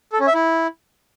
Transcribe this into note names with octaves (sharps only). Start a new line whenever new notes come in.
A4
C#4
E5
E4